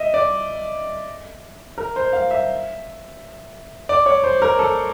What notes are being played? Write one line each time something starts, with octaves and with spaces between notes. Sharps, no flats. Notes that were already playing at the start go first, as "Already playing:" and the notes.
Already playing: D#5 E5
D5
A#4
C5
F5
E5
D5
C#5
C5
A#4
A4